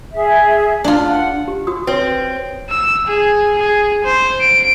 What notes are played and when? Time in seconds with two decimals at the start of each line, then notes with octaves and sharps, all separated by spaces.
0.14 G#4 E5
0.84 D4 F4
1.09 F#5
1.48 G4
1.67 F#4 D#6
1.87 C4 B4 C#5
2.70 E6
3.08 G#4
3.59 G#4
4.05 C5
4.42 D7